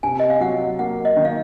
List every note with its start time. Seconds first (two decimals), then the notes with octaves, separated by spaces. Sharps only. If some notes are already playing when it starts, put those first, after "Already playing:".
0.03 C3 G#5
0.20 D#5
0.30 F5
0.41 F#3 F#5
0.79 A#3 F#5
1.05 D#5
1.16 D#3
1.25 F5